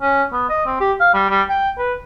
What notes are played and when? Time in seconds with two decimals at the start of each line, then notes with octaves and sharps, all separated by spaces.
0.02 C#4
0.33 B3
0.49 D#5
0.66 C4
0.80 G4
1.00 F5
1.14 G3
1.30 G3
1.50 G5
1.78 B4